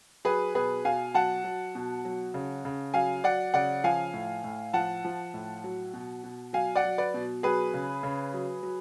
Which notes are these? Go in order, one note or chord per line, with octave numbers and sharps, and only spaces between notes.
F#3 G#4 B4
B2 G#4 B4
B2 F5 G#5
F#3 F#5 A5
F#3
B2
F#3
C#3
C#3
F#3 F5 G#5
F#3 D5 F#5
C#3 D5 F#5
F3 F5 G#5
A2
A2
F3 F#5 A5
F3
A2
F#3
B2
B2
F#3 F5 G#5
D5 F#5
F#3
B4 D5
B2
F#3 G#4 B4
C#3
C#3
F#3
F#3